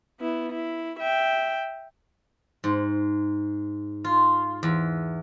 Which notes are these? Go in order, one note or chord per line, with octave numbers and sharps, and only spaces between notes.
B3 E4
E4
E5 G5
G#2
F4
E2